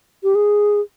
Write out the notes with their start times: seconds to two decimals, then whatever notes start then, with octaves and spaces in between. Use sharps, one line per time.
0.23 G4
0.35 G#4